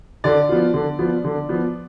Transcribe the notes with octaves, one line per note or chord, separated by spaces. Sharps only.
D3 D5
F3 B3 F4
D3
F3 B3 F4
D3
F3 B3 F4